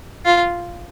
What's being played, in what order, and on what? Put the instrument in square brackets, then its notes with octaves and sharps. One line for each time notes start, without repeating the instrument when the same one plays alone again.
[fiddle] F4